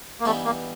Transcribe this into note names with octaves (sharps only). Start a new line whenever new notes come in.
A#3
G2 E3 G3 A3 B3 D#4
A#3